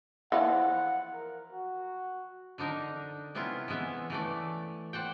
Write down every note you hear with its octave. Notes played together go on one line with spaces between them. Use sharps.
E3 F3 F#5
A#4
F#4
D3 D4 D#4 A#4
C3 B3 C#4 E4 F4
E3 G#3 B3 E5
E3 A3 D5
C5 D5 F#5 G5